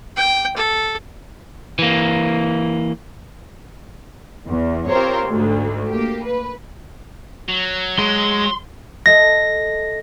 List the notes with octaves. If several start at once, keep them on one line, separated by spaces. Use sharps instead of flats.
G5
A4
E3 A#3
E2
C4 F4 G4 A#4 C5 C#5
D2 G#2
A#3 G4
B4
F#3
G#3 C6
A4 D#5 E5 A#6